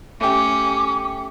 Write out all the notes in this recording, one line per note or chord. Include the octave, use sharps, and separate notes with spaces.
A3 C#4 G4 D6